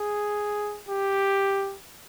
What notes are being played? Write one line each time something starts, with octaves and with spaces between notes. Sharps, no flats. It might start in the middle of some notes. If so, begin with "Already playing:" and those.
Already playing: G#4
G4